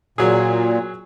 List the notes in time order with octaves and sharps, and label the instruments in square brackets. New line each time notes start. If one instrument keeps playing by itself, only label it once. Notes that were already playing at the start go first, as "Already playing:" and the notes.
[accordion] A#2 [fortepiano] F#3 G#4